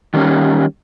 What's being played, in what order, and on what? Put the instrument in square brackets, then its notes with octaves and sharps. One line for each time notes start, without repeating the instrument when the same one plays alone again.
[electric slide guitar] D#3 G3 A#3 C#4